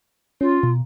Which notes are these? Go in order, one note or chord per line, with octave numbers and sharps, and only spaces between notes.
C#4 F4
B2